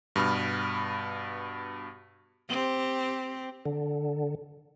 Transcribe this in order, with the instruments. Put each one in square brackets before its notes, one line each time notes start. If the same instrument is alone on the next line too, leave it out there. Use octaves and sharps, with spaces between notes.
[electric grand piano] G2 B2 B5 F6
[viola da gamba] C4 G4
[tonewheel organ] D3